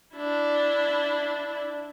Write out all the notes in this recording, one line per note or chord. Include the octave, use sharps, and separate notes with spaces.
D4 E4